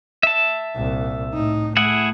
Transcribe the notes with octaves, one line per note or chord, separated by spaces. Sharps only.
E5 A5
C2 A#2
A2 D#4
A3 E4 G#4 F#5